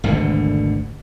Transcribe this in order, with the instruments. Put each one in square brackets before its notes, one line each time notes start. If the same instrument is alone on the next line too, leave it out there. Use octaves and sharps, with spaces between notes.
[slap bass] G#1 D2 B2 D3